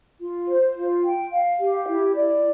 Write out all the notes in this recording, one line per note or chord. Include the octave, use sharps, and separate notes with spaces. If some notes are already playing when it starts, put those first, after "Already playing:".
F4
C5
F4
G5
F5
G4
E4
D5